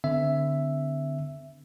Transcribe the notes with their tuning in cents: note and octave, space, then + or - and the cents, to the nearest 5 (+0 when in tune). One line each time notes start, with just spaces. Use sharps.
D3 -5 C4 -45 E5 +0